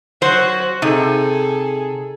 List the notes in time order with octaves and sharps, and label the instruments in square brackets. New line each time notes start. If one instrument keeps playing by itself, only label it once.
[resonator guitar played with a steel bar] F#3 C5 [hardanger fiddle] F#4
[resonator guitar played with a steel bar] C3 D#4 [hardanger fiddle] G#4 A4